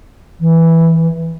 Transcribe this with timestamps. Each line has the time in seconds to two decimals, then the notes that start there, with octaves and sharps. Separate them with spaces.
0.40 E3